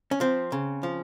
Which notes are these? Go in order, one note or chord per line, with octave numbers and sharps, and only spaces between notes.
C#4
F3 C4
C#3
F3